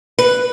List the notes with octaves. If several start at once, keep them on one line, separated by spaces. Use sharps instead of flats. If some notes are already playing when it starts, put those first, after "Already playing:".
B4